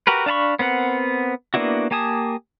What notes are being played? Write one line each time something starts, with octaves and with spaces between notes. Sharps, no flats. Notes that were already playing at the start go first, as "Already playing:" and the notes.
F#4 G4 A#4 B4
D4 F5 A5 B5 C#6
B3 C4 A#4 F#5
A#3 B3 D4 E4 F#4
A#3 G4 G#5 A5 D#6